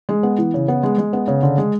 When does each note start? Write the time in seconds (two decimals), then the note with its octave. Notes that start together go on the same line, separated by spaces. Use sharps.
0.09 G#3
0.23 B3
0.38 E3
0.54 C#3
0.68 B3
0.83 G#3
0.98 G#3
1.13 B3
1.28 C#3
1.43 D3
1.58 G#3